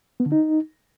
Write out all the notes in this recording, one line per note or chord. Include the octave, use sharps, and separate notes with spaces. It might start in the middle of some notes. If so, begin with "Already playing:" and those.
B3
D3
D#4